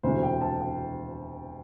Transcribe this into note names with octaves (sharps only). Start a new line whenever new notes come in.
E1 D2 C3 C5
G5
A5
G5